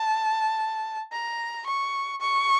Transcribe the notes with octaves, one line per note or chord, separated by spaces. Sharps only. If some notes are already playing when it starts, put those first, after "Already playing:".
Already playing: A5
A#5
C#6
C#6